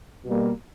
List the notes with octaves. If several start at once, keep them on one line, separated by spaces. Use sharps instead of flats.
B2 G3 A#3